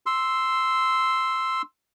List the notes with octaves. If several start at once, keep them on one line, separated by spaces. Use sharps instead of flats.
C6 E6